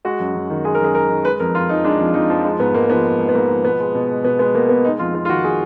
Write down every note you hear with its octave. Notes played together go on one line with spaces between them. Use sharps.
G#3 F#4
F#2
F#2
D#3
G#3 G#4
A#4
F#2 G#4
F#2 A#4
D#3
G#3 B4
F2 A#4
F2 F4
F3 D#4
G#3 D4
F2
F2 D#4
F3
G#3 D#4
G#2 B3
G#2 A#3
F3 B3
G#3
G#2
B3
G#2 A#3
F3
B2 B3
G#3
B2
G#3
B2 B3
G#3 B3
B2 A#3
G#3 B3
G#3 D#4
F2 F4
F2 F4
F4
D#3 F#4
G#3 G#4